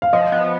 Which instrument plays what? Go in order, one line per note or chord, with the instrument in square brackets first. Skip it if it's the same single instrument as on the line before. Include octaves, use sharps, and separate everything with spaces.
[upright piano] F5
[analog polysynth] F3 [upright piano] D#5
[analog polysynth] B3